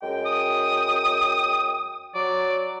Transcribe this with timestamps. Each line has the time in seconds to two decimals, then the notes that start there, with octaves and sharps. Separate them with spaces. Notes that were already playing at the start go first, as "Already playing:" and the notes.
0.02 F#2 G#3 G5
0.26 D#6
2.15 F#3 D5